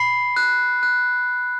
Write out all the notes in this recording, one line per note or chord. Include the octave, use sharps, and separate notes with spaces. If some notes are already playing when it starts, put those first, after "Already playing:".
Already playing: B5 C7
F#6
F#6